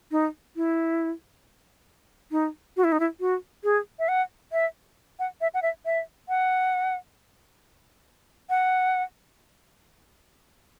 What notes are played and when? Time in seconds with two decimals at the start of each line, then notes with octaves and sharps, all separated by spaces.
0.12 D#4
0.56 E4
2.32 D#4
2.77 F#4
2.84 E4
2.92 D#4
3.00 E4
3.20 F#4
3.64 G#4
3.99 E5
4.08 F#5
4.52 E5
5.19 F#5
5.41 E5
5.54 F#5
5.62 E5
5.86 E5
6.29 F#5
8.50 F#5